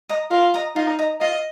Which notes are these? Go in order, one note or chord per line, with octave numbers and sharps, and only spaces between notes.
D#5 A#5 D#6
F4 A#4
D#5 A#5 D#6
D#4 F4
D#5 A#5
F4 D#5